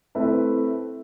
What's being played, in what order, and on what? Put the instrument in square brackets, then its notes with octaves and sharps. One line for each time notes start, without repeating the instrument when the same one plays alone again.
[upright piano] A3 C4 E4 B4